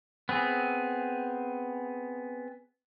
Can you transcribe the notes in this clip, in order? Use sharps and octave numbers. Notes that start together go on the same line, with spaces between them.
B3 C4 G#4